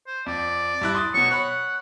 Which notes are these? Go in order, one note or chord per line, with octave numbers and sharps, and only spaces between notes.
C5
F2 D5
G2 E4 F#6
C6 D#6 A6
B2 F#3 C#6
C#5 F#5 B5